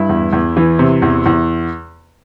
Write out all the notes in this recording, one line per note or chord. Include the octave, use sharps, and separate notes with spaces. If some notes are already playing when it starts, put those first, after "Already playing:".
Already playing: G2 E4
E2
E2
E3
C3
E2
E2